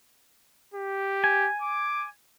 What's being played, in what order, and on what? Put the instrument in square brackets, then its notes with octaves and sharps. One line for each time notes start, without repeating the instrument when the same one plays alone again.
[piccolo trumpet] G4
[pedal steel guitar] G#5
[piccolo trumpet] D6